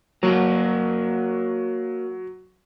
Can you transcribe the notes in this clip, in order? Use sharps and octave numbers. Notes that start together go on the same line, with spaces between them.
F#3 A#3 F#4